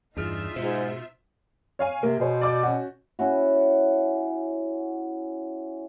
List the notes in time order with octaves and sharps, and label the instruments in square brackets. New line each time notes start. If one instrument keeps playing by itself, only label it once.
[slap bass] E2 G2 [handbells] D4 G#4 F6 [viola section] D#4 F4 E5
[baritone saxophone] G#2 [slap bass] B2 [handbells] C5
[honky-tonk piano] C#5 F5 G#5
[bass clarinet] C3 [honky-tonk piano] A#3
[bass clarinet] B2 [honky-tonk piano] G#4 C5 C#5
[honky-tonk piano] D5 D6 G6
C#4 F#4
[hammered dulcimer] C#4 E4 F#4